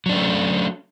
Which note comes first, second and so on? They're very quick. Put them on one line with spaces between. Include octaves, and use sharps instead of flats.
F#3 D4 C#4 A3